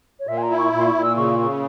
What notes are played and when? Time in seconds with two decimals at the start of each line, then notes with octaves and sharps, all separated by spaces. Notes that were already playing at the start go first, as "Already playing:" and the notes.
0.20 C#5
0.27 A#2 E5
0.38 G#5
0.43 A#5
0.50 E4
0.58 C#6
0.73 A#2
0.78 C6
0.87 C#6
0.95 A#2
1.03 E6
1.17 C#3 C#6
1.39 C#3